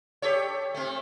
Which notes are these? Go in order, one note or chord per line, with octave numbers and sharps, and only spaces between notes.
G4 A4 C#5
A3 C4